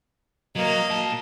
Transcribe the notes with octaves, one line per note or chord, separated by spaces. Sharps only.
F#3 A#3 D#5
A#2 A5